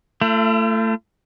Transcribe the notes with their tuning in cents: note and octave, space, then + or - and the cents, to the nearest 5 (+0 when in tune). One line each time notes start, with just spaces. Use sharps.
A3 +20 F4 -45